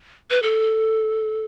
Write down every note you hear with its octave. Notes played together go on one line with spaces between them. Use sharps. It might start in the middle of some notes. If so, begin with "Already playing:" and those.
B4
A4